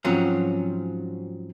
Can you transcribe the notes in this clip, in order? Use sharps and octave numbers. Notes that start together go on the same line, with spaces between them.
G#2 F3 F#3 C4 C#4